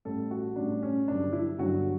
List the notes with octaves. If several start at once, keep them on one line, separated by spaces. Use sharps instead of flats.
A1 A2 G3 A4
F#4
A1 A2 G3 D4
C#4
G1 G2 D3 F#3 D4
E4
G1 G2 D3 F#3 F#4